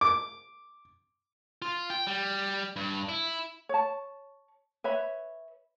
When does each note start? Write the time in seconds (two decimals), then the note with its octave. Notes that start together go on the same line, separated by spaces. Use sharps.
0.01 D6
1.62 F4
1.90 G5
2.07 G3
2.76 G2
3.09 E4
3.69 C#5 A5
4.84 B4 C#5 E5 B5